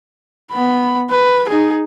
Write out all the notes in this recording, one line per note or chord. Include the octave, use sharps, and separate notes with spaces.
B3 B5
B4
D#4 G#4